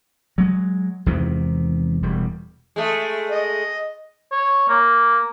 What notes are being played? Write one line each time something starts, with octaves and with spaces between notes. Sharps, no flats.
F#3 G#3
E2 G#2 C3 D#3
E1 G3
G#3 A3
D#5
C#5
A#3